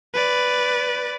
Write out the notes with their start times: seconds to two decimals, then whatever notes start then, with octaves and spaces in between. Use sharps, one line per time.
0.14 B4 D5